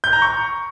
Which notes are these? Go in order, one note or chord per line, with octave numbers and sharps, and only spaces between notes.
G6
A#5
C#6